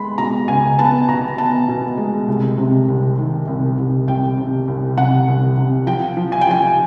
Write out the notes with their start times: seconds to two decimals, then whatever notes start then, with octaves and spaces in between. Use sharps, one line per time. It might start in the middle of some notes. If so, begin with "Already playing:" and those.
Already playing: G#3 B3 B5 C6
0.18 B2 A#5
0.48 C#2 G#5
0.79 B3 A5
1.08 B2 A#5
1.38 B3 A5
1.68 B2
1.98 G#3
2.28 C2
2.58 C3
2.88 C2
3.18 D#3
3.47 C2
3.78 C2
4.07 C2 G5
4.38 C3
4.68 C2
4.97 C3 F#5
5.28 C2
5.57 C3
5.87 F3 G5
6.17 F3
6.32 G#5
6.41 G5
6.47 F3 G#5